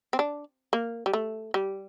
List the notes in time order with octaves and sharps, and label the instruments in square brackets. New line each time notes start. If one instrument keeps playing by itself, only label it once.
[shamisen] C4
D4
A#3
G3
A3
G3